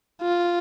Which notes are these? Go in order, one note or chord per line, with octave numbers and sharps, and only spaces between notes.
F4